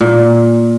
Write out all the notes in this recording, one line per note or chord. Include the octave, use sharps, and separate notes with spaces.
A#2